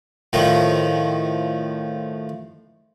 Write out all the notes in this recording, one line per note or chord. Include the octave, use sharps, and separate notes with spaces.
A2 D#3 F3